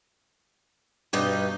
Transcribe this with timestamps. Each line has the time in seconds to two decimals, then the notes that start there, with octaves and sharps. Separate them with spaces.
1.13 G2 B2 D#4 G4